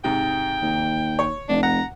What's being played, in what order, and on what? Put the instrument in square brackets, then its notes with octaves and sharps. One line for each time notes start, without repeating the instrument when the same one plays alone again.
[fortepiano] G#2 C3 [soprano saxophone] G5
[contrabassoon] D#2
[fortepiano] C#5
[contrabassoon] F1 [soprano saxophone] D4
[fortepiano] F#5 [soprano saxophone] A#5